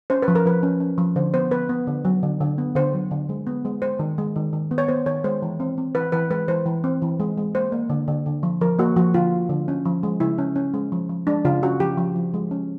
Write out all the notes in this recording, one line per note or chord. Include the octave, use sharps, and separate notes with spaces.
C#4 C5
B4
F3
A#4
F3 B4
C#4
C#4
F3
D3 C5
B3 C5
B3 B4
B3
D3
F#3
D3
D3
B3
D3 C5
F#3
D3
G#3
B3
G#3
G#3 C5
D#3
G#3
D#3
D#3
B3
C#5
B3 C5
D#3 C#5
G#3 C5
E3
C4
C4
E3 B4
E3 B4
G#3 B4
E3 C5
E3
C4
E3
G#3
G#3
A#3 C5
A#3
D3
D3
D3
F3
F3 A#4
A#3 F#4
F3 F#4
D3 F4
A#3
D3
C#4
F3
G#3
C#3 E4
C#4
C#4
G#3
F3
F3
G#3 D4
C#3 F4
C#4 F#4
F3 G4
F3
F3
G#3
C#4